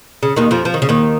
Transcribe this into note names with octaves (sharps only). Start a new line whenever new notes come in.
C#3
D#2 D#3
F2 F3
F3
D#3
C#3
D#2 D#3